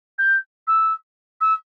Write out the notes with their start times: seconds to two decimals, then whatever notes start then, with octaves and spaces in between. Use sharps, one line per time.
0.18 G6
0.67 E6
1.40 E6